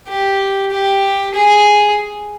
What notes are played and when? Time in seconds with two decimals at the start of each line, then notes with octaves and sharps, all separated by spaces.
0.08 G4
0.71 G4
1.34 G#4